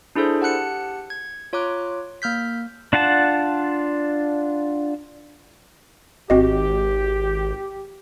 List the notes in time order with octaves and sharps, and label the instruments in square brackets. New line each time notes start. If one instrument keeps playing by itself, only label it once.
[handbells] D4 E4 G#4 A4 C5
G4 F#5 A5 F#6 C#7
G#6
F4 C#5 A#5 D6 F#6
A#3 F6 G6 B6
[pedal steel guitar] D4 F4 F#5 A5
[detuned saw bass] G#1 [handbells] C4 F#4 D#5 [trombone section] G4